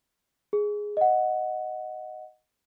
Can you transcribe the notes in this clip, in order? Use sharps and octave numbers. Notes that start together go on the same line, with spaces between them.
G#4
D#5 F#5